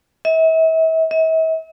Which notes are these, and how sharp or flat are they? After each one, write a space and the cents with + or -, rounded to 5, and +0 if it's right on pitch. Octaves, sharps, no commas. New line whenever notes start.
E5 -40
E5 -45